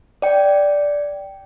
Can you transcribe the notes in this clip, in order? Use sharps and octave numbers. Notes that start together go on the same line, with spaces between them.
D5 G5